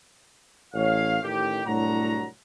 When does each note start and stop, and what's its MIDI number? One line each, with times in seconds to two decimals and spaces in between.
0.74 1.18 33
0.74 1.18 73
0.74 1.18 77
1.23 1.61 33
1.23 1.61 51
1.23 1.61 67
1.65 2.24 36
1.65 2.24 45
1.65 2.24 54
1.65 2.24 62
1.65 2.24 66
1.65 2.24 82